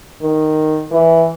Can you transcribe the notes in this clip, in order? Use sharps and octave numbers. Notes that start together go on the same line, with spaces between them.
D#3
E3